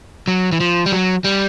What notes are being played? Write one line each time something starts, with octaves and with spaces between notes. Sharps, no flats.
F#3
E3
F3
G3
F#3
G3